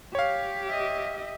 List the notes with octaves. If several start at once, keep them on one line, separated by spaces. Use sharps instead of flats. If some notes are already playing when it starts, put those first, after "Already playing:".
G4 C#5 F5
D#5 E5